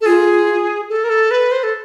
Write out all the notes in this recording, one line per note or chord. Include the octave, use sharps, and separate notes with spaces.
A4
F4 G#4
A4
A#4
A4
B4
C5
A4